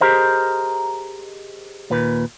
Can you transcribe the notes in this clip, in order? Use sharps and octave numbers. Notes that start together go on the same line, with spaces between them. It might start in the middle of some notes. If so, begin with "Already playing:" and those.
G4 G#4 A#4 C5 D#5
D#2 A#2 B4